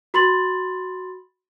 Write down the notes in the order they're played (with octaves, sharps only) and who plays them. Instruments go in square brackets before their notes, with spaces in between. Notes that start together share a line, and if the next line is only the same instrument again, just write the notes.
[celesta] F#4 B5 C6 A6 F#7